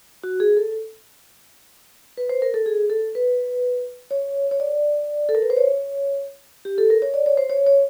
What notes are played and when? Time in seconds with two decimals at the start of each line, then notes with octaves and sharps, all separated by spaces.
0.24 F#4
0.40 G#4
0.57 A4
2.17 B4
2.29 C5
2.42 A#4
2.54 A4
2.66 G#4
2.90 A4
3.15 B4
4.11 C#5
4.51 C#5
4.60 D5
5.29 A4
5.35 A#4
5.42 B4
5.50 C5
5.57 C#5
6.65 G4
6.78 A4
6.90 A#4
7.02 C#5
7.14 D5
7.26 C#5
7.37 C5
7.50 C#5
7.67 C#5